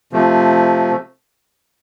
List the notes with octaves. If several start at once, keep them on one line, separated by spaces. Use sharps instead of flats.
C3 F3 A3